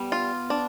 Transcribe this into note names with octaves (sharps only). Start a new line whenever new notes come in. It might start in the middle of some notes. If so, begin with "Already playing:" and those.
Already playing: G3 B3
F4
D4